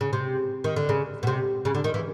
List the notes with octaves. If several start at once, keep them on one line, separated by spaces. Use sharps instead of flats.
C#3
C3
D#3
D3
C#3
B2
C3
C#3
D3
D#3
E3